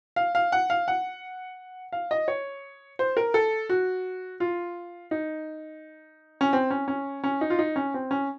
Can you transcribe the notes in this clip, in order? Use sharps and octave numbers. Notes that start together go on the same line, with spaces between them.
F5
F5
F#5
F5
F#5
F5
D#5
C#5
C5
A#4
A4
F#4
F4
D#4
C#4
C4
C#4
C#4
C#4
D#4
F4
D#4
C#4
C4
C#4